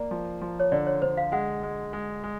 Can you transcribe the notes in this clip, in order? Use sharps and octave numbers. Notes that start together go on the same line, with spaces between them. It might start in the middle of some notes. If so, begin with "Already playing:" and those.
Already playing: A#3 D5
F3
F3
C#5
D3 D5
C#5
D3 C5
F5
G#3 F#5
G#3
G#3
G#3